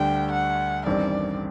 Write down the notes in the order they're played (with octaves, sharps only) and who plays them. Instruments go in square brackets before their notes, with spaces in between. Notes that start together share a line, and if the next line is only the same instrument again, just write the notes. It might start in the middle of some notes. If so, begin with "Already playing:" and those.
Already playing: [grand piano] D2 D3 G3 [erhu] G5
[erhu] F#5
[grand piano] A1 G2 D#3 G3 C4 [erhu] D5